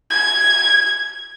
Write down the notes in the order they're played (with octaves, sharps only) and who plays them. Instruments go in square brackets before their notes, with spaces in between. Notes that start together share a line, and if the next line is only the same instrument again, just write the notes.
[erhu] G#6